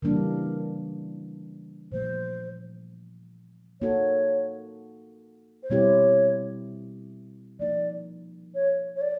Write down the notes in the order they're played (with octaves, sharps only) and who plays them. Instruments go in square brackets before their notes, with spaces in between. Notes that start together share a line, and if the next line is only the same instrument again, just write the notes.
[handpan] C#3 E3 G3 A#3 D4 [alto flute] A#4
[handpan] A#2 F3 A3 [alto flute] C5
[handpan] A#3 D#4 F#4 A4 [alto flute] C#5
[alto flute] C5
[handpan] B2 G3 C4 E4 G4 [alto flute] C#5
[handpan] F3 A#3 D#4 [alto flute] D5
[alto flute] C#5
C#5
D5